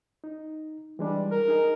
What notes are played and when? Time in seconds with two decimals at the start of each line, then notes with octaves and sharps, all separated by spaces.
0.24 D#4
0.99 E3 G3 G#3 D4
1.31 A#4
1.48 D#4 G#4 D#5